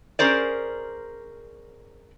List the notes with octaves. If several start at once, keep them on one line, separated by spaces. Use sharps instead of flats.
C#4 G#4 A#4 C5 D5